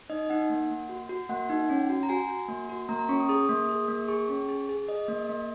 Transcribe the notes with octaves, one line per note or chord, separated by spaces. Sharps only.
D#4 D#5
D#4 F#5
A#3
A#3
F#4
F#4
A#3 F#5
D#4
C#4
F#4
A#5
F#4 G#5
F#4
A#3
F#4
A#3 A#5
A#5
C#4 C#6
D#6
G#4 D#6
A#3
G#4
A#3
G#4 C#6
C#4
G#4
G#4
G#4 D#5
A#3
A#3